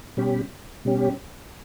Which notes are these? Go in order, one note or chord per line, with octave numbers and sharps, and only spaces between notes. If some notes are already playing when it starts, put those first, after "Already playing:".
B2 G3 C#4 G4
B2 G3 C#4 G4